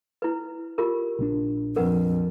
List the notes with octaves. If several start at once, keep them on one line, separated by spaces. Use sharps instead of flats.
E4 B4
F4 G4 A#4
A#1 D#3 D4
F2 A#4 B4 F#5